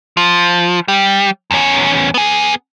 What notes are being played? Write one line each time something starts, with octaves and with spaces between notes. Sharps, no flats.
F3
G3
E2 C#4
B3 G#4